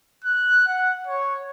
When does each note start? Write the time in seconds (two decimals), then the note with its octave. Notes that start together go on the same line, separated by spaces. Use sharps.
0.24 F#6
0.67 F#5
1.07 C#5